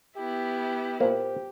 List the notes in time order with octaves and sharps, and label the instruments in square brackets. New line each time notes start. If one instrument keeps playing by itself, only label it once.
[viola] B3 E4 [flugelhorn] G4
[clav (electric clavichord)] A#2 A#3 [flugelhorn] G4 [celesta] C5